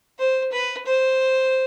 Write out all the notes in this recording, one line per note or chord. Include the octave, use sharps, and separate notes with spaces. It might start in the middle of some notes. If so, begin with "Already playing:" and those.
C5
B4
C5